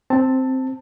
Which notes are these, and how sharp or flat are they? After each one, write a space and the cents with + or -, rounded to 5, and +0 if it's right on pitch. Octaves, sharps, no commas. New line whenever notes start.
C4 +0 A5 +15